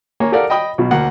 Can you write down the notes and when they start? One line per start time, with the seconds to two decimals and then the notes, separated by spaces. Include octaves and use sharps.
0.20 A#3 C#5 G#5
0.32 G4 A4 A#4 D5 F5 F#5
0.50 D#5 G5 B5 D#6
0.78 B1 B2
0.91 D2 A#3 F#5